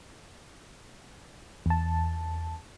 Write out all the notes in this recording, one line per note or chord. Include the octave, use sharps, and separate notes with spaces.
E2 A5